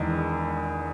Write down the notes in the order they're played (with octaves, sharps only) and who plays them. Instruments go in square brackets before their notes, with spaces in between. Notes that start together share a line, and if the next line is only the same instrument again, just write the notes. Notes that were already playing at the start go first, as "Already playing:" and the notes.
Already playing: [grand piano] E1 E2 D#3 G#3